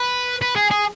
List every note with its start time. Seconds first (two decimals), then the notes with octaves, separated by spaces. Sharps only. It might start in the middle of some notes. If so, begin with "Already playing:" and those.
Already playing: B4
0.42 B4
0.56 G#4
0.71 G#4